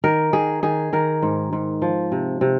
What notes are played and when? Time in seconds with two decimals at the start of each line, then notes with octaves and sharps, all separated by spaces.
0.04 D#3 A#4
0.33 D#3 G#4
0.63 D#3 G#4
0.93 D#3 A#4
1.22 G#2
1.53 G#2
1.82 F3
2.12 C3
2.41 C3